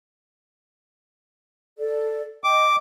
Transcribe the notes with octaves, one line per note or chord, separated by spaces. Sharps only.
A4 D5
D#5 G5 D6